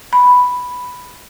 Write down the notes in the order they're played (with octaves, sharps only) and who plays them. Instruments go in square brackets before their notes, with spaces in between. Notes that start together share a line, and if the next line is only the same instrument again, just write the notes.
[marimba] B5